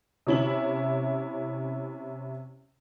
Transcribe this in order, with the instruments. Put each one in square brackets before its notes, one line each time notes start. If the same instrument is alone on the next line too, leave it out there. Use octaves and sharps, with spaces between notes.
[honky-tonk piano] C3 C#4 E4 E5 F#7